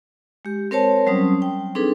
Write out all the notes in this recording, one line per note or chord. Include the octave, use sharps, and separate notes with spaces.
G#3 G4
C4 A#4 C5 C#5 A5
F#3 G3 C4 C#4 D#6
G5
C4 D4 D#4 G#4 A4 B4